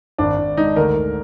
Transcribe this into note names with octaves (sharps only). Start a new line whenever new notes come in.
G#1 D4
G#1
G#2 D#4
D2 A#4
D2